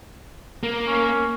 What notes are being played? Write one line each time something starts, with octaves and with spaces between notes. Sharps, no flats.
A#3
C#4